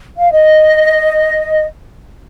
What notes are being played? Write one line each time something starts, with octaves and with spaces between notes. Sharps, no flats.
F5
D#5